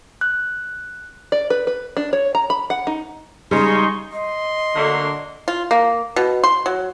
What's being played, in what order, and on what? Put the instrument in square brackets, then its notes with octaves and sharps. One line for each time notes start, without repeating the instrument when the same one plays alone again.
[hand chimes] F#6
[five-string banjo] D5
B4
B4
D4
C#5
A#5
B5
F#5
D#4
[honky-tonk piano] C#3 G#3 [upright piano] G3 [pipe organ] D#4 C6 C#6
[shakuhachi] D#5 [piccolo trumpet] C6
[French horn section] D3 [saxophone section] F#3 A3 A#3
[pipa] F4
A#3
B2
C6
F#3